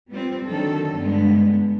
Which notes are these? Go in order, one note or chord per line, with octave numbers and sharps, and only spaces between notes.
G3 B3 C4 F4
D3 D#3 F#3 A#3 A4
G2 D3 G#3 B3